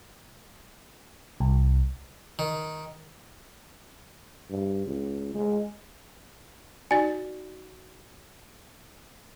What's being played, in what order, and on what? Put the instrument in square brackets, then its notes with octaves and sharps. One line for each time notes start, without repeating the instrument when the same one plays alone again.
[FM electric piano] C2
[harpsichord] D#3
[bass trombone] G2
C#2
G#3
[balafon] D#4 F#4 D5 [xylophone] G#5 A6